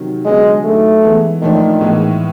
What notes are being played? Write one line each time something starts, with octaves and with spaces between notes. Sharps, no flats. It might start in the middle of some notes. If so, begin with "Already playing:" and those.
Already playing: C3 D#3 F#3
D3 F#3 G#3 B3 D4
F#3 A3 A#3 D#4
E3 G#3 B3
A#2 D#3 F3 A3 D4
A2 E3 G#3 B3 D#4